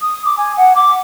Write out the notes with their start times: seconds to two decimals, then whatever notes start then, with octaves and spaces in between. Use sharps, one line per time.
0.01 D#6
0.25 D6
0.37 G#5
0.57 F#5
0.75 D6